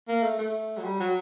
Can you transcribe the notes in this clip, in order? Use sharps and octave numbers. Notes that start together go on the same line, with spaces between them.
A#3
A3
A3
F#3
G3
F#3